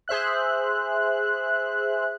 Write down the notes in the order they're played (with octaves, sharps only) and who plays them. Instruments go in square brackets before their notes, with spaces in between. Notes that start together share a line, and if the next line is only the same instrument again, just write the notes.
[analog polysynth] G#4 C5 E5 F#6